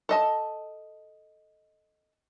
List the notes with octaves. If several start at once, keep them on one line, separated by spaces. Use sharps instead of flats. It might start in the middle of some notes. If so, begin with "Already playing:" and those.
A4 D#5 A5